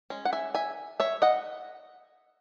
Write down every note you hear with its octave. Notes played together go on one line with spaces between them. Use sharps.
G#3 C#4
F#5
E5 G#5
E5 G#5
C#5 E5
D#5 F#5